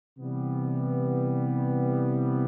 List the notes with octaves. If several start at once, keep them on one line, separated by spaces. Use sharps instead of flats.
C3 E3 G3 B3